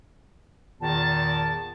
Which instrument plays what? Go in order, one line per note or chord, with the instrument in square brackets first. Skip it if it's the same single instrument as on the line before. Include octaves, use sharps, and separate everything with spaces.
[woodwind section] E2 A#2 D#3 [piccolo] A5